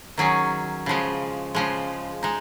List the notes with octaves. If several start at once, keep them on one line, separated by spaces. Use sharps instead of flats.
D#3 F#3 C#4 G#4
C#3 F3 G#3
C#3 F3 G#3
G#3 D#4